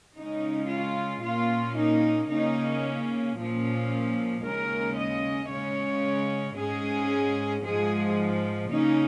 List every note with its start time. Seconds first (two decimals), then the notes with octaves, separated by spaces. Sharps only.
0.17 C#3 G#3 C#4 D#4
0.70 F4
1.24 A#2 A#3 C#4 F4
1.77 D#4
2.30 C#3 A#3 C#4 D#4
3.37 A#2 F3 A#3 C#4
4.44 D#2 C#3 G#3 C#4 A#4
4.97 D#5
5.50 C#3 G#3 C#4 C#5
6.57 G#2 G#3 C#4 G#4
7.64 G#2 F3 G#3 G#4
8.71 C#3 A#3 C#4 D#4